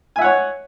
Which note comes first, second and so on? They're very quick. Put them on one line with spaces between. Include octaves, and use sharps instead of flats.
G#5 E5 F#5 C#5